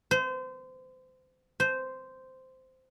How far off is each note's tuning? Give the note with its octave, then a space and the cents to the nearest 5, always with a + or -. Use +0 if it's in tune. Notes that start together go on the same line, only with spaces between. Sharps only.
C5 -30
C5 -10